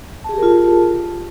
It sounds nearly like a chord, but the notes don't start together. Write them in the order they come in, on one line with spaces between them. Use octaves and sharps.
A5 G#4 G4 A#4 F4